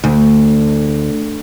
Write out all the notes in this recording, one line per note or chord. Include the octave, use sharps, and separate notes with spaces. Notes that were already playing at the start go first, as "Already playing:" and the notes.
D2